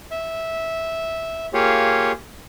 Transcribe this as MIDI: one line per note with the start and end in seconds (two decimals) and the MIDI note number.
0.11 1.46 76
1.54 2.12 58
1.54 2.12 65
1.54 2.12 67
1.54 2.12 68
1.54 2.12 73